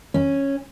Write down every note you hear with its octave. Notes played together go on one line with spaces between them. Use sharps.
C#4